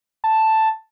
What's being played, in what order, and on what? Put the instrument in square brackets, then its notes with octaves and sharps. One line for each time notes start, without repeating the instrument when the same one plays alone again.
[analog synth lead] A5